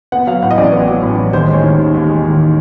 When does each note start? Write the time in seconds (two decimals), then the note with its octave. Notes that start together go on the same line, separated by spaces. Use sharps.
0.12 B3 F#5
0.27 F#3 F5
0.42 A2 F#5
0.51 D#5
0.58 A1 D5
0.72 B3
0.88 F#3
1.03 A2
1.18 A1
1.33 D#2 C5
1.49 G#3
1.54 C#5
1.63 D#3
1.79 D#2
1.94 D#2
2.08 G#3
2.24 D#3